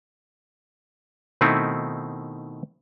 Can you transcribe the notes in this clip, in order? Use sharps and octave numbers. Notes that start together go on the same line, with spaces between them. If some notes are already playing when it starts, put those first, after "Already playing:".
B2 D#3 A3 C4 D#4 E4